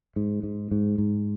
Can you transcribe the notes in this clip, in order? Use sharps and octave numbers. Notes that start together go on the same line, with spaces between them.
G#2
G#2
G#2
G#2